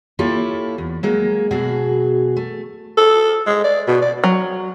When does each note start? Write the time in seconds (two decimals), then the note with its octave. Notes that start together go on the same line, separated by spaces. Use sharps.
0.19 A#3 E4 F4 G4 A4 C#5
0.78 E2
1.03 F#3 G#3 A#3
1.51 B2 F#3 F#4 G#4
2.36 A3
2.98 A4
3.46 G#3
3.64 D5
3.87 B2
4.02 D5
4.24 F#3